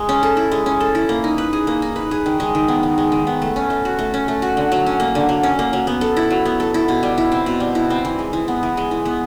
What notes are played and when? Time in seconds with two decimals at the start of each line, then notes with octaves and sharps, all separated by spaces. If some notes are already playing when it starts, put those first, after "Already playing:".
Already playing: G#3
0.09 C#4
0.23 A4
0.37 E4
0.51 G#3
0.66 C#4
0.80 A4
0.95 E4
1.09 A#3
1.24 D#4
1.38 B4
1.53 G#4
1.67 A#3
1.82 D#4
1.96 B4
2.11 G#4
2.26 D#3
2.40 G#3
2.55 D#3
2.68 B3
2.83 D#3
2.98 G#3
3.12 D#3
3.27 B3
3.42 A3
3.56 C#4
3.70 A3
3.85 F#4
3.99 A3
4.14 C#4
4.28 A3
4.42 F#4
4.57 D3
4.72 F#3
4.86 C#4
5.00 A#3
5.15 D3
5.29 F#3
5.43 C#4
5.59 A#3
5.73 F#3
5.87 B3
6.01 A4
6.17 E4
6.31 F#3
6.45 B3
6.60 A4
6.74 E4
6.88 B2
7.03 G3
7.18 E4
7.32 C4
7.46 B2
7.60 G3
7.75 E4
7.90 C4
8.05 E3
8.19 G#3
8.33 E3
8.48 B3
8.63 E3
8.77 G#3
8.91 E3
9.05 B3